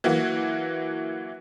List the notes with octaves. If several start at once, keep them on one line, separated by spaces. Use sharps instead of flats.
E3 F#3 A#3 F#4